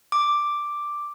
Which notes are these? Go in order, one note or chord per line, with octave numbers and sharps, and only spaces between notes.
D6